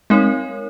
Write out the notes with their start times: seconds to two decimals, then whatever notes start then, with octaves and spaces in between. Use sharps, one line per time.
0.10 G#3 C4 D#4 A#4 C#5